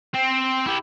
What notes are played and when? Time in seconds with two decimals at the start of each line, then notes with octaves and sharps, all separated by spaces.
0.14 C4
0.66 E4 G4